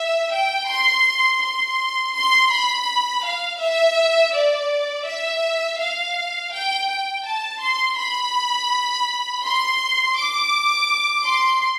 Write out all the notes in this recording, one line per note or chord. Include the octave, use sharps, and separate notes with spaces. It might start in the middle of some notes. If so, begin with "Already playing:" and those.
Already playing: E5
G5
C6
C6
C6
B5
F5
E5
D5
E5
F5
G5
G5
A5
C6
B5
C6
D6
C6